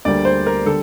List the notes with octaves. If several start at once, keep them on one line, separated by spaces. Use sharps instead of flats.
D2 D3 G3 A#3 D5
C5
A#4
D3 G3 A4